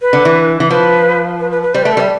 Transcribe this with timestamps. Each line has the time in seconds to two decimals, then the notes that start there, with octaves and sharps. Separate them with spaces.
0.02 B4
0.13 D3
0.25 E3
0.60 E3
0.70 F3 B4
1.40 B4
1.51 B4
1.63 B4
1.74 G3 C5
1.82 B4
1.85 A3
1.92 A4
1.97 G3 E5